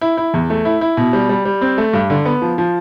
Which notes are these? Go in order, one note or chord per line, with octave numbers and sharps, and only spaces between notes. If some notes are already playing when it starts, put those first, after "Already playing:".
E4
E4
E2
A3
E4
E4
B2
G3
G3
G3
C4
A3
G2
D3
B3
F3
F3